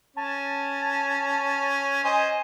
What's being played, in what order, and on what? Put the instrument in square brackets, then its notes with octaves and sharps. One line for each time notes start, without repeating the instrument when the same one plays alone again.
[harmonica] C#4 [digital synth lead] A5
[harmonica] C5 D#5 [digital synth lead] G#5